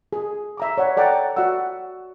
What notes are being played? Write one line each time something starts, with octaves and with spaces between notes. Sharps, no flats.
G#4
E5 A#5 D6
C#5 D5 F#5
A4 D5 F#5 G5 A#5
F#4 D5 E5 F#5 E6